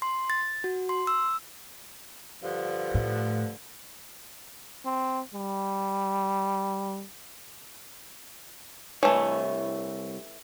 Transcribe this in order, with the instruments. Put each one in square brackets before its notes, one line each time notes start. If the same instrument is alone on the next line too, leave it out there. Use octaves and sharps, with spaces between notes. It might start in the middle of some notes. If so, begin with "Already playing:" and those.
[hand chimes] C6
A6
F#4
C6
E6
[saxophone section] G2 D3 F3
[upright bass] A2
[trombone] C4
G3
[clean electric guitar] C2 C#5 [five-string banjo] E3 A3